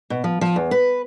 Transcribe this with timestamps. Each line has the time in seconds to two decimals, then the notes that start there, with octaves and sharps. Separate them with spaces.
0.10 B2
0.24 F3
0.41 F3
0.56 E2
0.71 B4